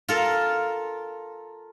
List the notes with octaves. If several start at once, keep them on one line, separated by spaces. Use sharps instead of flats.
F4 A4 A#4